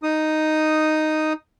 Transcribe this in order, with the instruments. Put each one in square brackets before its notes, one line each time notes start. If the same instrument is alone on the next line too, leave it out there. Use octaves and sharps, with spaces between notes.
[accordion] D#4 D#6